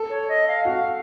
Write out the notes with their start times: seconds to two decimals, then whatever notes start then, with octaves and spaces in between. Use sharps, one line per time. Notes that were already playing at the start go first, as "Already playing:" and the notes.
Already playing: A4
0.10 C#5
0.28 D#5
0.47 F5
0.65 F#4 F5